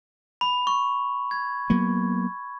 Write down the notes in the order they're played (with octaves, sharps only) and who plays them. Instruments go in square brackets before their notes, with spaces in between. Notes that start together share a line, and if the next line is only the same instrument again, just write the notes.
[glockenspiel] B5
C#6
G#6
[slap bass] F#3 A#3 B3